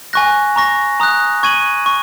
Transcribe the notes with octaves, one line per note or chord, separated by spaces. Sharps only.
G#5 C#6 F#6 A#6
A#5 C#6 A#6
A#5 D#6 F#6
C#6 G#6 D#7 F#7
C#6